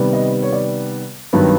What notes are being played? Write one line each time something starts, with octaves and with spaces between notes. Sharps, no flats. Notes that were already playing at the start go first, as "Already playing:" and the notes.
Already playing: C3 D#3 G3 B3
D#5
C#5
D5
G2 D#3 F#3 B3